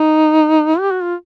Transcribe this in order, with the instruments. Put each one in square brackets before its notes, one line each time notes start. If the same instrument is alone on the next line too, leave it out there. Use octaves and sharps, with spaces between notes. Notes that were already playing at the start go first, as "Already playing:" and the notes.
Already playing: [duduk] D#4
G4
F#4
F4